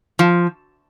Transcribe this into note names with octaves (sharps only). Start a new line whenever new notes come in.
F3